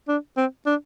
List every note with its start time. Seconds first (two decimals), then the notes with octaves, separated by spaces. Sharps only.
0.08 D4
0.37 C4
0.66 D4